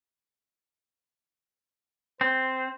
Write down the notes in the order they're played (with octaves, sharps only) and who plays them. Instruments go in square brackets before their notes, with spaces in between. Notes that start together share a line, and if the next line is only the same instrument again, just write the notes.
[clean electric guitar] C4 [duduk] C5